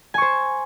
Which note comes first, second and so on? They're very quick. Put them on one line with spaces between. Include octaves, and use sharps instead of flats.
G#5 C#6 C5